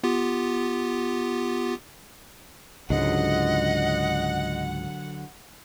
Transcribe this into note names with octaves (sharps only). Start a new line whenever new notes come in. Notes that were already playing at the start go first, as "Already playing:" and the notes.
B3 F4 G4
C#2 G#2 D3 F#3 D#5 F#5